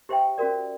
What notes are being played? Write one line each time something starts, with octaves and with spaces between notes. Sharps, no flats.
E4 G4 C5 E5 G5
C#4 F#4 A#4 D5